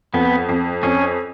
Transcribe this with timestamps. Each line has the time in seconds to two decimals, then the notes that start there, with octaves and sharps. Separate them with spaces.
0.14 F2 B3
0.49 F2
0.83 F2 C#4